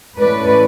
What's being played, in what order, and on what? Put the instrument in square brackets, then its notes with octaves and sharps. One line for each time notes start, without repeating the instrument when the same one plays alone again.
[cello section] A2 E3 A3 C#4 B4 D5